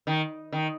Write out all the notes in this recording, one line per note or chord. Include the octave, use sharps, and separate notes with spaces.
D#3
D#3